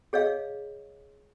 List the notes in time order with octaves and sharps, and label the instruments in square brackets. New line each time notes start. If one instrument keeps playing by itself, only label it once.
[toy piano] G#4 C#5 D#5 F5